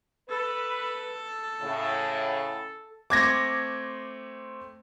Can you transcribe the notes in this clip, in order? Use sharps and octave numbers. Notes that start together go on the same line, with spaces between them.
A4 B4
A2 C#3
A3 C4 D6 G#6 A#6